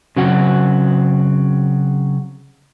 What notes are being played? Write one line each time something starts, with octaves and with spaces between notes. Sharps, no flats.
C#3 F#3 C4 F#4